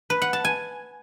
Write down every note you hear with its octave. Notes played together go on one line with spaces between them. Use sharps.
B4
F#5
A5
G#5